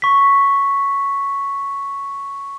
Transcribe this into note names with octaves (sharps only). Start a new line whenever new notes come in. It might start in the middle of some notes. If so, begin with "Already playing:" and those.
C#6 B6